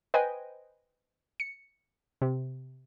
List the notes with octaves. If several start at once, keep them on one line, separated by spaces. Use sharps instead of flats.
B4 C5 D#5 G5 G#5
C#7
C3